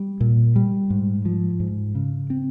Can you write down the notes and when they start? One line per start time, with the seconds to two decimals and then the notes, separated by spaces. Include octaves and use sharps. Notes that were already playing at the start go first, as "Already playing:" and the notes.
Already playing: G3
0.20 A#2
0.56 G3
0.90 G#2
1.25 F3
1.60 G#2
1.95 C#3
2.30 C4